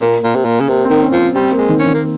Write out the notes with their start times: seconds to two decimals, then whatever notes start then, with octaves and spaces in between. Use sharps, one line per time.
0.01 A#2 A#3
0.24 A#2
0.36 C3
0.45 A#2
0.61 C#3
0.69 C3 A#3
0.85 C4
0.90 D#3
1.02 C#4
1.12 F3
1.18 C4
1.35 G3 C4
1.52 A#3
1.58 G#3
1.69 D#3
1.80 C#4
1.86 D#3
1.95 A#3